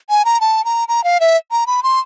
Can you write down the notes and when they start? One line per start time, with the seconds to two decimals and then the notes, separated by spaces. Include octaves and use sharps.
0.10 G#5
0.25 A#5
0.41 A5
0.65 A#5
0.88 A#5
1.04 F5
1.20 E5
1.51 A#5
1.67 B5
1.83 C6